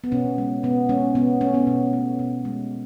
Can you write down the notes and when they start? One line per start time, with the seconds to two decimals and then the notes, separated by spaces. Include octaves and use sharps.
0.04 B3
0.12 B2 C#4
0.38 G#3
0.63 B2 B3
0.89 G#3 C#4
1.15 B2 B3
1.41 A3 C#4
1.54 B3
1.67 B2
1.93 A3
2.19 B2
2.45 G#3